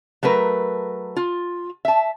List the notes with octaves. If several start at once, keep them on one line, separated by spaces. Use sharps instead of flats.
F#3 A3 A#4 B4
F4
E5 A5